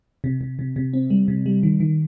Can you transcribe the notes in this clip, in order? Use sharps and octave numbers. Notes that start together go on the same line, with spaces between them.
C3
C3
C3
C3
C4
G3
C3
G3
D#3
D#3